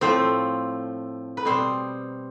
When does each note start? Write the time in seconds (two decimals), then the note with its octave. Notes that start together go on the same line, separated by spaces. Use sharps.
0.01 A2 F3 A3 C4 C5
1.37 B4
1.45 B2 G3 C4 C5